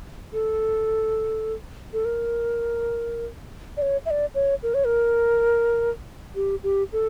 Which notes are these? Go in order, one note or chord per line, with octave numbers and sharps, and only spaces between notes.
A4
A4
A#4
D5
C#5
E5
D5
C#5
A#4
C#5
A#4
G4
G4
A4